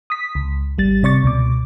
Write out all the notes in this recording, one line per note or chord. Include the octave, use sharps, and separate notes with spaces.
D#6 B6
C#2
G#1 G3 A6
C3 D5 C#6 A6
C#2 B2 D6